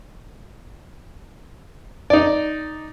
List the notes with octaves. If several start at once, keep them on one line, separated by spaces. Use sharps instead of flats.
D#4 D5